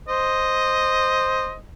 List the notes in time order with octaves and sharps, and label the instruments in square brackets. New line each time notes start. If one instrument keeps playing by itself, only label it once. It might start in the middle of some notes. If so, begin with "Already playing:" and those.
[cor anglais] C5 [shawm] D#5